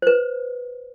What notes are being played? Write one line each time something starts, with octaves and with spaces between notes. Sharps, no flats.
B4 C5